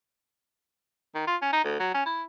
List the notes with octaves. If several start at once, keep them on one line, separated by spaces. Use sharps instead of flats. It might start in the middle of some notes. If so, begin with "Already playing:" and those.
D#3
F4
C#4
D#4
D2
F#3
C#4
E4